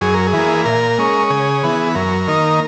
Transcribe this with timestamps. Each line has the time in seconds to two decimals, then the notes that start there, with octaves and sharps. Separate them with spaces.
0.01 F#2 G#4
0.14 A#4
0.27 G#4
0.33 E3 A#3
0.66 A#2 A#4
0.98 G#3 C#4
1.30 C#3 G#4
1.63 E3 B3
1.95 F#2 A#4
2.28 D#3 A#3 D#4